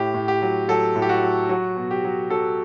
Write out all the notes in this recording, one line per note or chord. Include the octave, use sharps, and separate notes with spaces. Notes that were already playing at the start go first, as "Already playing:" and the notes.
Already playing: A2 G4
A2
G4
F#3
F#3 A4
A2
G4
F#4
F#3
F#3 F#4
B2
G4
F#3
F#3 A4